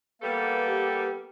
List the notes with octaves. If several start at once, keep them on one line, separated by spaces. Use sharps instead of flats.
G3 A#3 B3 A4 B4 F5
G4